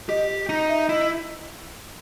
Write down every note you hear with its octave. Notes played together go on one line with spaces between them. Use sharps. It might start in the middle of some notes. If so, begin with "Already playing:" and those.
G4 D#5
D#4
E5
E4 D#5